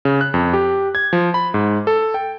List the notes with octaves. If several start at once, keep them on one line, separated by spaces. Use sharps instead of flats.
C#3
F#6
F2
G4
G#6
F3
B5
G#2
A4
G5